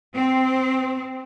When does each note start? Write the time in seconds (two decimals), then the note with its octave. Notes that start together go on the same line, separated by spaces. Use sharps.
0.14 C4